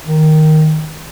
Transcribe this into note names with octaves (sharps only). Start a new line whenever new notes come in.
D#3